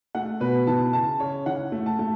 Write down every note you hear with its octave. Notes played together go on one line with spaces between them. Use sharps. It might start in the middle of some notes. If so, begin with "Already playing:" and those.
A3 F#5
B2 B4
E3 A5
C#3 A5
C#3 C#5
E3 F#5
A3
A5
A3